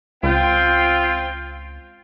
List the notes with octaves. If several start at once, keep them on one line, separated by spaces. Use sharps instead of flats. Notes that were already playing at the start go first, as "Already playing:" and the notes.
C#2 C4 F4 G5